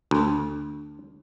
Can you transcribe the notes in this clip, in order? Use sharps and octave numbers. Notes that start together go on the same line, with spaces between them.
D2